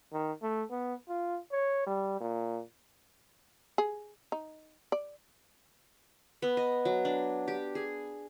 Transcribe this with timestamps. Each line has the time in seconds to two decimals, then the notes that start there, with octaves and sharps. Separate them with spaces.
0.13 D#3
0.42 A3
0.71 B3
1.09 F4
1.52 C#5
1.87 G3
2.20 A#2
3.78 G#4
4.32 D#4
4.92 D5
6.42 B3
6.57 D#5
6.85 F#3
7.05 D4
7.48 G4
7.75 G#4